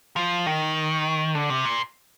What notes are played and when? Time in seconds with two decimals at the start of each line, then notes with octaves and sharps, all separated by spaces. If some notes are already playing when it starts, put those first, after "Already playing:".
0.16 F3
0.46 D#3
1.35 D3
1.50 C3
1.65 A#2